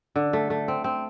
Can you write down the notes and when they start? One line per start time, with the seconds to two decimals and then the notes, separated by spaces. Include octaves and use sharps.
0.16 D3
0.33 A3
0.50 A3
0.68 C4
0.84 C4